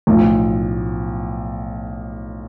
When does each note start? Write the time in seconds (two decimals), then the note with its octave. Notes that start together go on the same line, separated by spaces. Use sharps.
0.07 B1 A2 F3